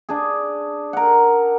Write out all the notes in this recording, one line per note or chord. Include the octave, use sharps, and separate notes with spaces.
D4 G#4
A#4 F#5